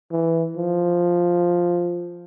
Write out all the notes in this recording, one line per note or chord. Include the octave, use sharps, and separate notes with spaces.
E3
F3